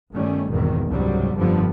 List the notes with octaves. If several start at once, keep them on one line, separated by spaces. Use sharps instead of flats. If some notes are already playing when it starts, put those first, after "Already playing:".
G1 D#3 G3 A3 C#4
G#1 E2 G2 B2 D#3
C#2 G#2 C3 F#3 G3
F1 G2 D3 F3 G3 B3